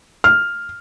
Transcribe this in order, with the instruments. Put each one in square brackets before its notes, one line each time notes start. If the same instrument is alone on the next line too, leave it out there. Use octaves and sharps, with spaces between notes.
[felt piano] F6